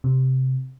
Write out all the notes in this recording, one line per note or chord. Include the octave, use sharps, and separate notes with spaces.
C3